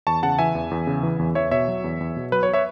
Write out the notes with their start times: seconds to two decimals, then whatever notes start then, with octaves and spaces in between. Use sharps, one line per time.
0.07 E2 A5 C#6
0.23 C#3 F#5 A5
0.39 E3 E5 G#5
0.55 E2
0.71 E2
0.87 C#3
1.03 E3
1.19 E2
1.35 E2 C#5 E5
1.51 B2 C#5 E5
1.68 F#3
1.84 E2
2.01 E2
2.17 B2
2.32 F#3 B4
2.43 C#5
2.53 C#5 E5